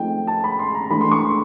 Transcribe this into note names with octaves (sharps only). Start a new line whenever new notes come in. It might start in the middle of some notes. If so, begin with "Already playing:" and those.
Already playing: F3 A3 C4 D#4 G5
A5
B5
C6
A#5
E3 A3 D4 B5
C6
C#6
C6